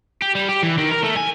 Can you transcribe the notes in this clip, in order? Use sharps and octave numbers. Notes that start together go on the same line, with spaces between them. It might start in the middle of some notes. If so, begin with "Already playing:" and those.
G4
G3
G4
E3
D#3
A#4
A3
G#5